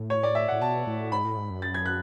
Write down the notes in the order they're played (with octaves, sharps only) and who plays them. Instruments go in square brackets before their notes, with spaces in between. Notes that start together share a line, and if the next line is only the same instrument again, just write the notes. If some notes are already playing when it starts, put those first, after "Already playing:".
Already playing: [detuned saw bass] A2
[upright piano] C#5
D5
E5
[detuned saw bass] A2 [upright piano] F#5
[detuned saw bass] B2 [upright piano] A5
[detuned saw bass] A2
[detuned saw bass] G#2 [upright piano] B5
[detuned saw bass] A2
G#2
F#2
[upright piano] A6
G#6
F#6